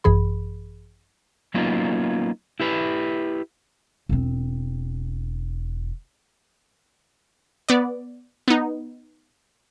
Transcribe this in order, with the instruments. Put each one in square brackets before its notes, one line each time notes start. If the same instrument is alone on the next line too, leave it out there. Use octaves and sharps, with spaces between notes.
[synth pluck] G#1 F#2 E3 G#4 B5
[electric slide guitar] F#3 A#3 B3 C#4 D#4 F4
E4 G4 B4
[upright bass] E1 C4
[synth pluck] B3 D5
B3 D#4